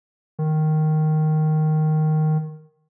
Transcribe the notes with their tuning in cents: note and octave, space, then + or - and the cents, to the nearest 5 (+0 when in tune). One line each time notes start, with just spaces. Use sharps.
D#3 -5